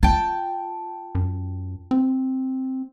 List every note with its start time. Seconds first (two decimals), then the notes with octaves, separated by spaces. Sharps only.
0.03 F4 G5 A5
1.15 F#2
1.91 C4